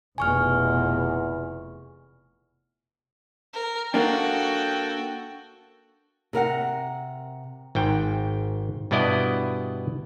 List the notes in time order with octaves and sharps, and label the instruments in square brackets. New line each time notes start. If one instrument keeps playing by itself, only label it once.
[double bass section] F1 B2 [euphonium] E2 [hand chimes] G#5 C#6 F6
[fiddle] A#4
[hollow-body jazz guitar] A#3 D4 [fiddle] F#4 [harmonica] A4 G5
[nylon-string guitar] C3 A#4 F5 F#5
[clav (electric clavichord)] G#1 G#2 G5
G2 B2 B3 E4 D5 D#5